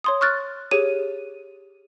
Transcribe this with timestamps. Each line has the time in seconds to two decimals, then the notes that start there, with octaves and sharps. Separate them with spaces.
0.04 C#5 C6 D#6
0.21 C#6 F6 F#6 A6
0.71 G4 G#4 C#5 D#7